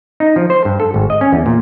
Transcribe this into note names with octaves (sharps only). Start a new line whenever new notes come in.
D#4
F3
C5
G2
A4
G#1
D#5
C#4
E2
A#2